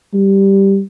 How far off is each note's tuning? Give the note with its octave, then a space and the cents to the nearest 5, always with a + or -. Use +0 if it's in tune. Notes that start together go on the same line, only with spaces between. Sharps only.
G3 +0